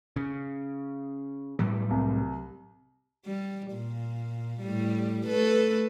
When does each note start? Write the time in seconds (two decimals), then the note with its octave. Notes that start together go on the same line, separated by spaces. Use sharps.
0.16 C#3
1.59 A2 F#3 G3
1.91 C2
3.25 G3
3.72 A#2
4.61 A2 G3
5.27 A3 A4 B4